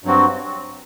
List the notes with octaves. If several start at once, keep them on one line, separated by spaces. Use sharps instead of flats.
G2 F#3 C4 F#4